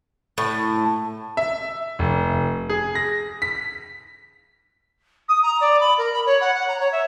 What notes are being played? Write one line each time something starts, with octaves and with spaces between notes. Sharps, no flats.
A2
E5
F1
G#4
A#6
B6
D#6
A#5
D5
B5
A#4
B5
C#5
F#5
F#5
A#5
C#5
E5